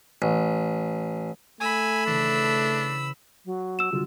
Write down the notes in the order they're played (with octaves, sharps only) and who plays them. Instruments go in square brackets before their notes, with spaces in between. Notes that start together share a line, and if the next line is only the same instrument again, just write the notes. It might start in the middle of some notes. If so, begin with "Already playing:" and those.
[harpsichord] A1
[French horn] A3 [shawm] G#5 [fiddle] B5 E6
[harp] C#3 E3 [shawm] D4
[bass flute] F#3
[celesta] E6 E7
[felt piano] G1 F#4 [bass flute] F4